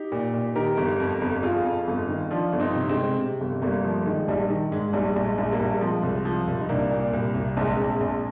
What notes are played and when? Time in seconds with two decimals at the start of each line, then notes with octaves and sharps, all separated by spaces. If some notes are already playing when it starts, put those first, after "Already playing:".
Already playing: D#4 G4
0.12 A#2
0.34 A#2
0.55 D#3 G4 A#4
0.77 G1
1.00 F2
1.21 G1
1.43 F2 F4 G#4
1.65 F2
1.87 G1
2.09 D#3
2.31 F3 D4 F4
2.53 G1
2.60 C4 D#4
2.75 C3
2.89 G#3 C4
2.97 C3
3.18 C3
3.41 G1
3.62 G1 G3 A#3
3.84 F3
4.06 D#3 G#3
4.28 A#1 G3
4.50 D#3
4.72 G#2 G#3
4.93 A#1 G3
5.16 A#1
5.23 G#3
5.38 A#1
5.52 G3 A#3
5.60 A#1
5.81 F3 G#3 C4
6.03 C2
6.25 F3
6.47 C2
6.61 D#4
6.69 C2 A#3 D4
6.91 A#2
7.13 C2
7.35 C2
7.57 A#1 G#3 C4
7.79 A#1
8.00 A#1